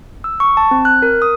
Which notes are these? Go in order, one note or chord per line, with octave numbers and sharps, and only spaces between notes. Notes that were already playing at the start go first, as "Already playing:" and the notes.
E6
C#6
A5
C4
F#6
A#4
D#6